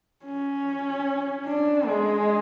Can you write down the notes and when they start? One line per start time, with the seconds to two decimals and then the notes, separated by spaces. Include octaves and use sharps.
0.25 C#4
1.46 D4
1.87 G#3